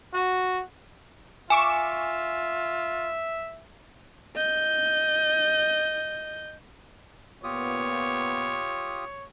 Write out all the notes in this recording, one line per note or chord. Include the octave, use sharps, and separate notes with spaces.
F#4
F4 E5 G#5 C#6 D6 E7
D#5 G6
A#2 B3 F4 G4 C#5 D#6